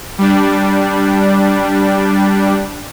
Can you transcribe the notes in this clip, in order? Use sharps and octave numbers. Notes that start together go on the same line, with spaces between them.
G3 D4